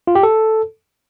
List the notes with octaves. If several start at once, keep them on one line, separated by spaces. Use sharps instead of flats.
F4
G4
A4